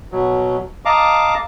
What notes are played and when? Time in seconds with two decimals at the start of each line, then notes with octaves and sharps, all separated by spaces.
0.12 B2 F#3
0.85 D#5 F5 A5 A#5 D6